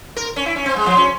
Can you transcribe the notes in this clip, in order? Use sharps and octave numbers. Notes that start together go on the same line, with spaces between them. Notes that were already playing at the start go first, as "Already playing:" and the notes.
A#4
C#4
E4
C#4
C4
G#3
F3
C#4